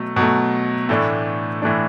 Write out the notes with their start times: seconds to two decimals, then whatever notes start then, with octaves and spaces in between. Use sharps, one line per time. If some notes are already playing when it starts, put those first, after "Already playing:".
Already playing: B2 F#3 A3
0.16 B2 F#3 A3
0.89 A2 E3 A3 D4
1.62 A2 E3 A3 D4